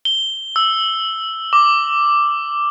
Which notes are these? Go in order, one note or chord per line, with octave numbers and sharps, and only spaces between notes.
G7
E6
D6